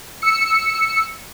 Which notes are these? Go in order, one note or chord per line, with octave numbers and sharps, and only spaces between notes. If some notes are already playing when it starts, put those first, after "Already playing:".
E6 C#7